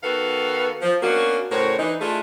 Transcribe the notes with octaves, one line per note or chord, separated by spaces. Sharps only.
D#3 B3 F#4 A4 B4 F5
F3
A#3 B3 C#4 D4 F#4
A2 C#3 F#4 A#4 C5 C#5
E3 D4 D#4
A3 D4 E4 F4 G#4 A4